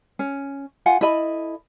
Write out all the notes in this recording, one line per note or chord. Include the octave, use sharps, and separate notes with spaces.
C#4
F4 F#5 G#5
E4 A4 D#5 B5